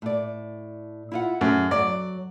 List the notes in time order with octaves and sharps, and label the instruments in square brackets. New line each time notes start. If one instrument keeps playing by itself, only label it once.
[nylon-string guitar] A2 D5
E4 F4 F#5
[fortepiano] F#2 [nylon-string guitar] A3 G#4
[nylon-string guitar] F#3 [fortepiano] D5